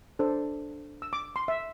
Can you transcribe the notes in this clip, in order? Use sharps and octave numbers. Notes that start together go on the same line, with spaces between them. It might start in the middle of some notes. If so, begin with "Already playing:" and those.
D4 A4 C5
E6
D6
C6
E5